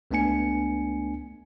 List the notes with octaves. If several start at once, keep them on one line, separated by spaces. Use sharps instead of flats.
C#2 A3 B3 D4 G#5 C#7